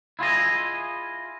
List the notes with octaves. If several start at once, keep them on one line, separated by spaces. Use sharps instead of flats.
E4 F4 G#4 D#5